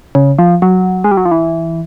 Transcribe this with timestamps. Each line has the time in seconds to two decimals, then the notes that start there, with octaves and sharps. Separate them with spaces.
0.15 C#3
0.39 F3
0.62 F#3
1.04 G#3
1.11 G3
1.17 F#3
1.25 F3
1.31 E3